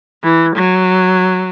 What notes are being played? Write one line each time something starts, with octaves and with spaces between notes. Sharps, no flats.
E3
F#3